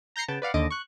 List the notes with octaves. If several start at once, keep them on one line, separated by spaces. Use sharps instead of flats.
A#5 G6 A#6 C7 C#7
C#3 B3 G5 A5
B4 D5 F5 F#5
D#2 D3 D#5 D6
C#6 F#6